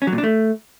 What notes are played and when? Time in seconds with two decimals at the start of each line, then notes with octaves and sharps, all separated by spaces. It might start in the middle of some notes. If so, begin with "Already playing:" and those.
0.02 C#4
0.07 F#3
0.13 A#2
0.18 D4
0.24 A3